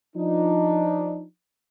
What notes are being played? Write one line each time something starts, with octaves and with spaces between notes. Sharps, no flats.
F3 D4 D#4